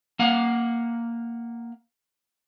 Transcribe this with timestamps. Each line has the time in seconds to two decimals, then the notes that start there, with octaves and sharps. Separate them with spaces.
0.19 A#3 F5 F#5